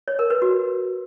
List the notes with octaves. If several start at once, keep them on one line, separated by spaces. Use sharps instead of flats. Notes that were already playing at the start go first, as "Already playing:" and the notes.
C#5
A#4
B4
F#4